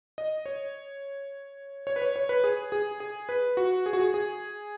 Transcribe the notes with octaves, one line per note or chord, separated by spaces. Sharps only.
D#5
C#5
C#5
B4
C#5
C#5
B4
G#4
G#4
G#4
B4
F#4
G#4
F#4
G#4
G#4